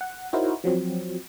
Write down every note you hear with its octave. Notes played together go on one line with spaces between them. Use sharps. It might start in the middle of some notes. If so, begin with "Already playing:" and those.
F#5
D#4 E4 F#4 A#4 C5 C#5
F3 F#3 C4